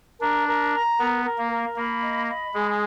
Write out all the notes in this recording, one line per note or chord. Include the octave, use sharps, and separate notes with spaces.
D4 A#4
A#4
A#5
B3 A#4
A#4
A#3
A#4
A#3 B5
D#5
B5
G#3 G#4